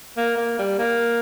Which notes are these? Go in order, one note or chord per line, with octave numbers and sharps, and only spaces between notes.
A#3
A#3
G3
A#3